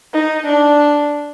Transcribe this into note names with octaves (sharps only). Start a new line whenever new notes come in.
D#4
D4